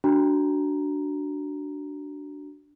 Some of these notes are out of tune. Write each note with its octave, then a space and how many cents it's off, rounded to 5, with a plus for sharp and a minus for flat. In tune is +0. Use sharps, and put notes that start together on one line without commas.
D4 +0 F#4 +20 A#5 +0